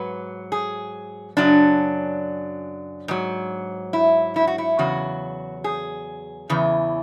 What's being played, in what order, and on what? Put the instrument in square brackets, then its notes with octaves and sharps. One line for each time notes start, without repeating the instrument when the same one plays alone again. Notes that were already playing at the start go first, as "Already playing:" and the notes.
Already playing: [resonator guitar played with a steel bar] G#2 F#3 B4
G#4
F#2 C#3 F#3 D4
G#2 F#3
E4
E4
F#4
E4
E2 C#3 F#3 F#4
G#4
E2 C#3 E3